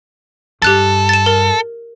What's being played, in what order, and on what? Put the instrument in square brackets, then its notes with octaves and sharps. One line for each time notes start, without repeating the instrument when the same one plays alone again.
[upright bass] G2 [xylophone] G4 F#6 A6 [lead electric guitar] A4
[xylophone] A6 E7
A#4